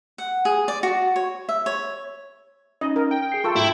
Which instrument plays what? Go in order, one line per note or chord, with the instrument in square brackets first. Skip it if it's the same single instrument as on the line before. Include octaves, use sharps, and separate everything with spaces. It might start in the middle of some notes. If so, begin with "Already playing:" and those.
[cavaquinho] F#5
G#4
D5
F#4
C#5
E5
C#5
[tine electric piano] C#4 D#4 [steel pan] D#5
[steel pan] A#4
[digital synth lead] G5
[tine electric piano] G#4 C7
[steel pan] F4 A4 [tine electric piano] C6 C#6 E6
[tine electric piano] G#2 [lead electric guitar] E4